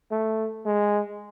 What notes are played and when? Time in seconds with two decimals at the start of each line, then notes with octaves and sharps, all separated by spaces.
0.11 A3
0.65 G#3